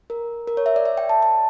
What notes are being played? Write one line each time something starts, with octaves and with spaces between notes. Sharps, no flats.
A#4
A#4
C#5
E5
D5
E5
G5
A5
A5